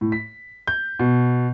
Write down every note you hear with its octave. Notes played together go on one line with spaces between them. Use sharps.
A2
B6
G6
B2